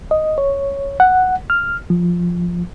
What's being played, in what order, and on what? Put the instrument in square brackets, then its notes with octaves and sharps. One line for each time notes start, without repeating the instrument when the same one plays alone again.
[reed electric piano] D#5
C#5
F#5
F6
F3